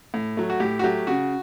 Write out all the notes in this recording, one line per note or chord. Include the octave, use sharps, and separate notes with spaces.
A2
F#3 A3
F#4
A2 G4
F#4
F#3 A3 G4
C#3 F#4